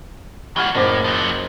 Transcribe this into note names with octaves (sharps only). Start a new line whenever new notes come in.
E3 F#4 C#6 F6 G#6
F#1 A2 C5 D6
F3 F#3